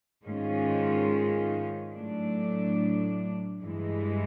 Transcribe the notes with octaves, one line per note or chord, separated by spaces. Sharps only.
G#2 D#3 G#3 C#4 F4
A2 F#3 A3 D4
G2 E3 G#3